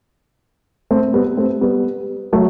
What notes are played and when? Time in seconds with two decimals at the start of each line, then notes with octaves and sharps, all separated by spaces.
0.91 A3 C4
1.14 G3 B3
1.37 A3 C4
1.61 G3 B3
2.33 F#3 A3